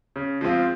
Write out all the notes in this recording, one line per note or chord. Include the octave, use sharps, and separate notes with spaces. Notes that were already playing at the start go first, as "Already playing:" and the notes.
C#3
F3 G#3 C4 F4